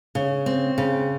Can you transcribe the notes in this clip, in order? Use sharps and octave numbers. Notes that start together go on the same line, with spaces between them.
C#3
C4
C#3